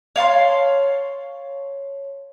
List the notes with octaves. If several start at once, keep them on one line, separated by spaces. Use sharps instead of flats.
C#5 F5 A5 C6